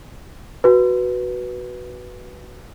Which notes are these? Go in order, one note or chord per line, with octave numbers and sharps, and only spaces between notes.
F#4 B4